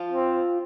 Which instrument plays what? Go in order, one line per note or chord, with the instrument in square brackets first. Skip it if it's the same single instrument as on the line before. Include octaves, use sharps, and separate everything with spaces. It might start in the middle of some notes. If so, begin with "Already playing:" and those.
Already playing: [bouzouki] F3 F4
[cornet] C4